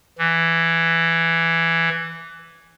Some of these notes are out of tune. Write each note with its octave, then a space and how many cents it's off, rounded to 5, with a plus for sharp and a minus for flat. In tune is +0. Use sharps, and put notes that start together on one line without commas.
E3 +10